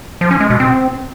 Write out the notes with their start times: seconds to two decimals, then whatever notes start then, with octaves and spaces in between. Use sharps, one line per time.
0.21 F3
0.31 C#4
0.40 G#3
0.50 B2
0.60 C4